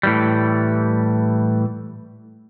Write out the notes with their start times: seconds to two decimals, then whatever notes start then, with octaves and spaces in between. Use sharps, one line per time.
0.03 A2 E3 G3